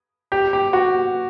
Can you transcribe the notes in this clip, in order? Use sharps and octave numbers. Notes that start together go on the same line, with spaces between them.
G4
G4
F#4